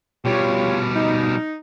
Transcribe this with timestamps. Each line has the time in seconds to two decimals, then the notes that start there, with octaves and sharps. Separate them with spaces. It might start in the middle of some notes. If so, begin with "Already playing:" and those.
0.25 B2 G3 F4 G4 C#5
0.96 D#4